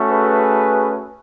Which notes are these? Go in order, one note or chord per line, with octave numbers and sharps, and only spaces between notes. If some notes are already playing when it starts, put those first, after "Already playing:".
Already playing: A3 C#4 F#4
G#4 B4